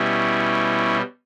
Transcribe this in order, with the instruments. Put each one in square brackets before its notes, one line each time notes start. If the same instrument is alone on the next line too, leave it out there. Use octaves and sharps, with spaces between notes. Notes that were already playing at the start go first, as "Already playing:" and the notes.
Already playing: [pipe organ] B2 G3 C#4 E4